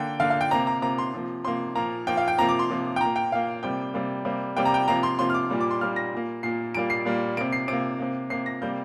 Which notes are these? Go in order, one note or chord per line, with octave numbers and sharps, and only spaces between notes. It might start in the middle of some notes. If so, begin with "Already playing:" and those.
Already playing: D3 A#3 G5
D3 A#3 F5
F5
G5
C3 A#3 A#5
A#5
C3 A#3 A#5
C6
C3 F3 A#3
C3 F3 A#3 C6
A#2 F3 A#3 A#5
A#2 F3 A#3 G5
F5
G5
C3 F3 A#3 A#5
D6
C6
C3 F3 A#3
G5
A#2 A#3 A#5
G5
A#2 A#3 F5
C3 G3 A#3 G5
C3 G3 A#3
C3 G3 A#3
C3 G3 A#3 G5
A#5
G5
C3 F3 A#3 A#5
C6
C3 F3 A#3 C6
F6
D6
A#2 G3 A#3
D6
C6
A#2 G3 A#3 F6
A#6
A#2 A#3
A#2 A#3 C7
A#2 G3 A#3 D7
C7
A#2 G3 A#3
C3 A#3 D7
C7
C3 A#3 D7
C3 A#3
C3 A#3 C7
A#6
C3 G3 A#3 G6